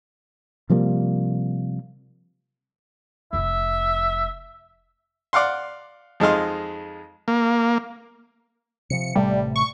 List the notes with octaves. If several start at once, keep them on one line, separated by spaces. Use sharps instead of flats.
C3 F3 G3 A#3
F1 F2 E5
D5 F5 F#5 C6
F2 G#3 D#4 F5 C6
A#3
C3 F3 C#7
A1 C3 G3 A3
C#6